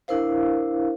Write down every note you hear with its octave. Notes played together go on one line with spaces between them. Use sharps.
D4 E4 A#4 C5 F5